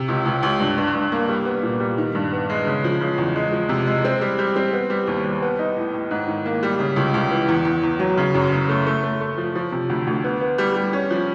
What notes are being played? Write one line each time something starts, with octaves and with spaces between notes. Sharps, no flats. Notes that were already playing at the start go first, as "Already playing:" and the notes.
Already playing: C3
C#2
C#2
C#2
G2
G2
G2
A#3
G3
B3
A#2
G3
D#3
G2
B3
G#3
C#3
F3
C#3
E2
G#3
F3
C3
G#3
C4
G3
G3
C4
B3
G3
D#2
G3
B3
D#4
A2
A2
G#2
D#3
A#3
G3
C#3
C#2
C#2
E3
E2
E2
E2
F#3
C#3
F#2
C#3
A3
A3
A3
A3
F3
F3
C3
D2
D2
B3
B3
G3
G3
C#4
F3